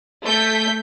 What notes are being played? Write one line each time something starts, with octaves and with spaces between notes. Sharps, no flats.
A3 G6 B6